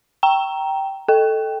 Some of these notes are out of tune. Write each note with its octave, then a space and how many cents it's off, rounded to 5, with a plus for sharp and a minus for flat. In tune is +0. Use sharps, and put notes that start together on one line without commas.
G5 -10 A#5 +0
A4 +0 G5 +0